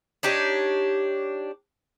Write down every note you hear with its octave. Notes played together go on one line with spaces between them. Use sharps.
D4 D#4 G4 C#5